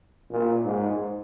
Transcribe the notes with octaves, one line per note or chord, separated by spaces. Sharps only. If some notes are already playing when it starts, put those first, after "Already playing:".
A#2
G#2